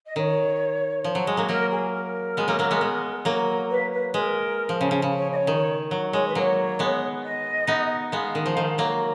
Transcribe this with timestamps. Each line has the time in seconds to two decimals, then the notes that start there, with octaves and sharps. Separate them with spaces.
0.06 D#5
0.16 D#3 C#5
1.04 F3
1.15 F#3
1.27 G#3
1.37 F#3 A#3
1.49 F#3 A#3 A#4
1.71 G#4
1.93 A#4
2.37 G#3 B3
2.48 F#3 A#3
2.59 F#3 A#3
2.71 G#3 B3
2.81 G#3
3.25 F#3 A#3
3.70 B4
3.92 B4
4.14 G#3 A#4 B4
4.69 F3
4.81 C#3
4.91 C#3
5.02 C#3
5.17 C#5
5.32 D#5
5.35 C#5
5.47 D#3
5.91 F#3
6.13 G#3 C#5
6.27 B4
6.35 F#3 A#3 C#5
6.79 G#3 B3
7.24 D#5
7.67 B3 D#4
8.12 G#3 B3 F5
8.35 D#3
8.46 F3
8.57 D#3
8.78 F#3 A#3